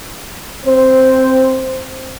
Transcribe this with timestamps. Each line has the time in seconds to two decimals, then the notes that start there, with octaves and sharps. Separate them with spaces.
0.67 C4 C5